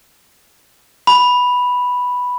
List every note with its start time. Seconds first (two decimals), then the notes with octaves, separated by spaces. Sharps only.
1.07 B5